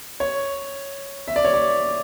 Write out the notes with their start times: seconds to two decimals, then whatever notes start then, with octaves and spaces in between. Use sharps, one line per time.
0.20 C#5
1.28 E5
1.36 D5
1.45 C#5
1.54 D5